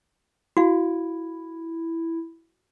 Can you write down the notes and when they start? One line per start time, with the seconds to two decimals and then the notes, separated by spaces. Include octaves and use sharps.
0.57 E4 F#4 F5